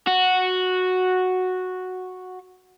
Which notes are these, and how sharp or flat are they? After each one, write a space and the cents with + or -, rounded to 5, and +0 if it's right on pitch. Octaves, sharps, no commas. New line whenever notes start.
F#4 -5